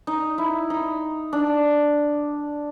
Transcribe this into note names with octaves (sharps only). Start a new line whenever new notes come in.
D#4
E4
D#4
D4